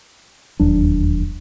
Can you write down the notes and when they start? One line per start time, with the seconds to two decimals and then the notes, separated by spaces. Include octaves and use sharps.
0.60 E1 D#2 F#3 D4